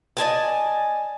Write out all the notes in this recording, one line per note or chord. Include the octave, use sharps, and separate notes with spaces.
D5 D#5 G#5 A5